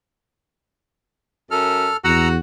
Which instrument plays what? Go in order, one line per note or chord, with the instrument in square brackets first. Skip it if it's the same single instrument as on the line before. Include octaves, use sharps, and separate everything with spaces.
[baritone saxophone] F#2 [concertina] A4 F6
[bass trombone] E2 [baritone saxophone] F#4 [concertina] F#5 A#5 E6